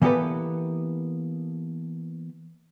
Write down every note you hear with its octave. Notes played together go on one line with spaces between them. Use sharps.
E3 A#3 B3 G4 A4 B4